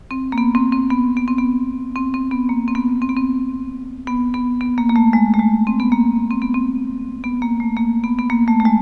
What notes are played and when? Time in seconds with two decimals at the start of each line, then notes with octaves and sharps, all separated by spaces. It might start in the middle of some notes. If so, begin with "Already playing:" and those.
0.11 C4
0.32 A#3
0.38 B3
0.55 C4
0.73 C4
0.90 B3
1.17 B3
1.28 C4
1.38 B3
1.96 C4
2.14 C4
2.31 B3
2.49 A#3
2.68 C4
2.75 B3
3.02 C4
3.09 B3
3.17 C4
4.07 B3
4.34 B3
4.61 B3
4.78 A#3
4.89 A#3
4.96 A3
5.13 G#3
5.34 A3
5.39 G#3
5.67 C4
5.80 B3
5.92 A#3
6.31 C4
6.42 B3
6.54 C4
7.24 B3
7.42 A#3
7.60 A3
7.77 A#3
8.04 B3
8.19 B3
8.30 A#3
8.48 A3
8.60 A3
8.65 G#3